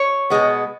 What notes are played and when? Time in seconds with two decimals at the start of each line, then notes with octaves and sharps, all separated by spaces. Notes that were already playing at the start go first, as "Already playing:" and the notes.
Already playing: C#5
0.30 B2 G#3 B3